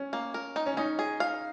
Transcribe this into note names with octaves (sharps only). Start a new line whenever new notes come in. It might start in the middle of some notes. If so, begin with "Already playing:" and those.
Already playing: C#4
A#3
A#4
D#4
C#4
C#4 D#4
G#4
F5